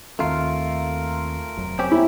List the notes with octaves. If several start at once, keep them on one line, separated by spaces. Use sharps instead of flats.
D#2 D#3 A3 C4 F4 A#4
F1 F2 F#3
C4 C#4 G4
E4